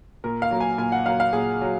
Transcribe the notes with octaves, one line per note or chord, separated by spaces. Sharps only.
A#2 A#4
F5
F#3 A#3
G#5
A#2 G#5
F#5
F#3 A#3 F5
F5
A#2 G#4
F#3